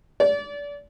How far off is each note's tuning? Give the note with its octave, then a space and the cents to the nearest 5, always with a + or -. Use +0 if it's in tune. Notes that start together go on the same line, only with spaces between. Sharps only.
D5 -30